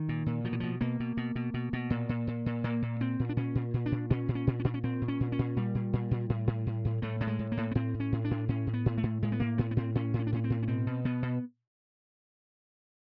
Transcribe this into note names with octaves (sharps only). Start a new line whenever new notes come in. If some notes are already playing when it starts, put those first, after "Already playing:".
Already playing: D#3
A#2
A#2
B2 F3
E3
B2 F3
B2 A#3
B2
B2
B2
B2
B2
A#2
A#2
A#2
A#2
A#2 A#3
A#2
A#2 C4
A#2
D4
A#2 C#4
A#2
A#2
D4
A#2
A#2 C#4
A#2
C#4
A#2
C#4
A#2 D4
C#4
A#2 C4
A#2
C#4
A#2
C#4
A#2
A#2 G3
A#2
A#2
A#2
A2
A2
A2
A2
A2 A3
A2 A3
G#3
A2
A#3
A2
B3
A2 C4
A2
C#4
A2
D4
A2
A2 C#4
A2
B3
A2
A3
A2
A2 G#3
B3
A2 A#3
A2 B3
B3
A2 C4
A2 C#4
A2
C#4
D4
A2 C#4
C4
A2
C#4
B2 C4
B2
B2 B3
B2